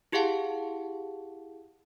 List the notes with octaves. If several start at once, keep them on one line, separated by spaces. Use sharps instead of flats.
E4 G4 G#4 F5 F#5 A5